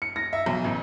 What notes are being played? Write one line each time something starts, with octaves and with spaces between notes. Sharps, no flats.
C#7
A#6
E5
B1
A1